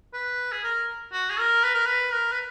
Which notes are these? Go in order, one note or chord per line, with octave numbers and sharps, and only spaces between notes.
B4
G#4
A#4
F#4
G#4
A#4
B4
A#4
B4
A#4
B4